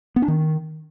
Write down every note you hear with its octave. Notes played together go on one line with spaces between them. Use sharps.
B3
D4
D#3